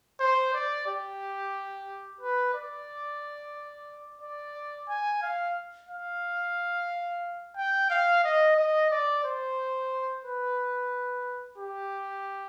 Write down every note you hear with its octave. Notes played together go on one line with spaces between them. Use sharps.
C5
D5
G4
B4
D5
D5
G#5
F5
F5
G5
F5
D#5
D#5
D5
C5
B4
G4